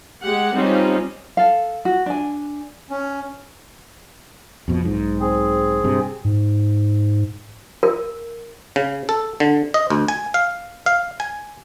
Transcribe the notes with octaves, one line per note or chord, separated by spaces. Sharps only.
G#3 G4 F#5
G3 C4 C#4 D#4 F4
A4 F5
F#4
D4 G#5
C#4
F2 B2
B1 G#2
C4 G#4
G2 C3
G#2
A#4
C#3
A4
D3
D#5
D2
G#5
F5
F5
G#5